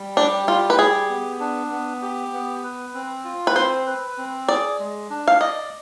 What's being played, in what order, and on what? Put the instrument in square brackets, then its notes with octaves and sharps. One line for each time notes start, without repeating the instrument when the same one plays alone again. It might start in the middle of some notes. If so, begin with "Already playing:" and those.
Already playing: [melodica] G3
[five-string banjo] D4 [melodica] G4
[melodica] G3 [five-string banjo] F4
[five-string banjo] B4
[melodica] G4 [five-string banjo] G#4
[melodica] B3
D4
B3
G4
B3
B4
C4
F4
[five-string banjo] B4
[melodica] C4 [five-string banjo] C5
[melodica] B4
C4
[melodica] G#4 [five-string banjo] D5
[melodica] G#3
D4
[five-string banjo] F5
[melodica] D5 [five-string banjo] D#5